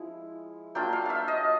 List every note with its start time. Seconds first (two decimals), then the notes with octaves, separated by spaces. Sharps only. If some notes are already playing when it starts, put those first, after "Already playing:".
Already playing: F3 G#3 E4
0.75 F#3 A#3 D4 F4 G5
0.93 F5
1.06 E5 F5
1.28 D#5